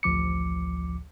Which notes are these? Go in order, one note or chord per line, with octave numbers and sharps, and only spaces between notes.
A1 D2 F3 D6 C#7